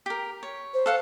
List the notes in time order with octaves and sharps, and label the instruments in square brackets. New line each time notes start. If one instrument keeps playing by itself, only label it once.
[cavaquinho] G4 A#4
C#5
[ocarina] C5
[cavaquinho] A4 F5 F#5